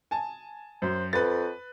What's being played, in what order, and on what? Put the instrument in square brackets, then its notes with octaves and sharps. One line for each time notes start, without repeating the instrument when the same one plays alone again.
[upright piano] G#5 A5
[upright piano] F#2 [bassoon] C5
[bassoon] F2 [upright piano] B4 A6